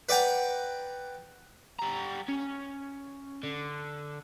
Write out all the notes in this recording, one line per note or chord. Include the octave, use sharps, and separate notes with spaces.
B4 D5 F#5 G5 A#5
G3 A#5
C#4
D3